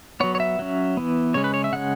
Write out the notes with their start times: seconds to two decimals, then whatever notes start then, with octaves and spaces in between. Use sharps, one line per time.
0.20 F#3 B3 C#5
0.35 C#5
0.40 E5
0.59 F#3 C#4
0.97 E3 B3
1.34 C#3 G#3 C#4 C#5
1.44 B4
1.54 C#5
1.64 E5
1.73 C#3 G#3 C#4 F#5